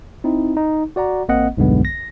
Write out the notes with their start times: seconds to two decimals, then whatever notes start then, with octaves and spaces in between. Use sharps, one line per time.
0.24 C4 D#4 E4
0.57 D#4
0.96 F#4 D5 F#5 A#5
1.28 A1 A#3 C4 D#5 F#5
1.57 B1 E2 G2 D3 G#3 B3
1.85 A#6